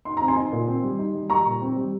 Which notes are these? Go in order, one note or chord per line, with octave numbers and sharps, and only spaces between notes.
D#4 C6
C4 A#5
G#5 C6
D#4
A#2
C4
G3
D#4
G3
G3 A#5 C#6
A#2
C4
G3